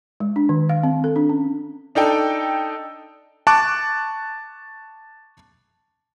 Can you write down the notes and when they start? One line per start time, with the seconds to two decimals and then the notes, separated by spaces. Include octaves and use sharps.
0.20 G#3
0.36 D4
0.49 D#3
0.69 F5
0.83 C4
1.04 A4
1.16 D4
1.29 C#4
1.95 D4 D#4 A4 G5
3.47 A5 C#6 D6 F#6